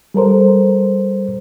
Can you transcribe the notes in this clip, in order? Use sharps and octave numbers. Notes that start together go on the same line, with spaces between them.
G3 A4 A#4 C5